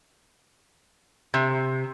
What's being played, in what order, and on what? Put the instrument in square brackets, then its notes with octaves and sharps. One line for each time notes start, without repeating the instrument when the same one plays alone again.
[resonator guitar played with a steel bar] C3